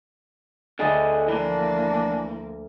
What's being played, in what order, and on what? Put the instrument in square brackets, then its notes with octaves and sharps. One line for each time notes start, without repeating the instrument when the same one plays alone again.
[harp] D2 A6 [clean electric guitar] D3 G#4 D#5
[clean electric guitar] E3 [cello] F3 A#3 [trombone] D4